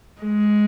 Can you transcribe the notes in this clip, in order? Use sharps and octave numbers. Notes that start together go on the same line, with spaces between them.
G#3